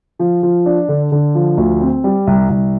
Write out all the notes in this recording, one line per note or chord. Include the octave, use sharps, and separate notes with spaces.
F3
F3
D4
D3
D3
F3
D2
C4
G3
C2
C2